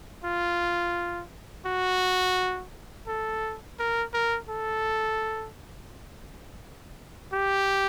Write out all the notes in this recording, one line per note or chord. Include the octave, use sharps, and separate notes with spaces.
F4
F#4
A4
A#4
A#4
A4
G4